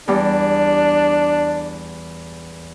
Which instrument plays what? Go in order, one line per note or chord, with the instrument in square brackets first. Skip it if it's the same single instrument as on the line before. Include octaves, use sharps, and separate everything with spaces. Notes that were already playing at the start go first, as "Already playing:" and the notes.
[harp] E2 G3 [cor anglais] D4